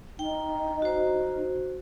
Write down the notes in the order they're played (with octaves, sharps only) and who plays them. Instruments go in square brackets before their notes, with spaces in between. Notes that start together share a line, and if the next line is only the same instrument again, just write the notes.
[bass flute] D#4 [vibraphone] G5
[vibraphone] F#4 C5